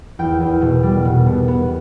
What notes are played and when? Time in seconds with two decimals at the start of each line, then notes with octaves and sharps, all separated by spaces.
0.19 E2 G5
0.40 E2
0.62 B2
0.83 G3
1.05 B2
1.27 B2
1.48 B3